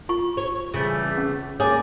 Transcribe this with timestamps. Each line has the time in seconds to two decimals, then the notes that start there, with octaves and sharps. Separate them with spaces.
0.09 F4 C#6
0.37 C#5
0.74 C#3 E3 G3 A3
1.18 C#4
1.60 A#3 G#4 C#5 D5